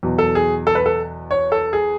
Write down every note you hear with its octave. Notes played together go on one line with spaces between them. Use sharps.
E2 B2 F#3
A4
G#4
A4
B4
A4
C#5
A4
G#4